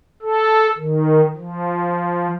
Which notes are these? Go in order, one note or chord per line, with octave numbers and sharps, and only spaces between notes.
A4
D#3
F3